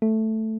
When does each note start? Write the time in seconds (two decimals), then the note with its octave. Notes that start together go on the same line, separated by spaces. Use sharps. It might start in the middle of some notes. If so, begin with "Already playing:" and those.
0.02 A3